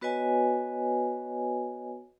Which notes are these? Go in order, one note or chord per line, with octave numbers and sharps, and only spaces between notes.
B3 F#4 B4 C#5 D#5 G#5